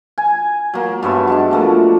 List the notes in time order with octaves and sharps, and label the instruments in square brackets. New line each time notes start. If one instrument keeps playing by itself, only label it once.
[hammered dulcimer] G#5
F#3 A#3
G2 B3 C#5 E5
F#3 G#3 D4
F3 A3 A#3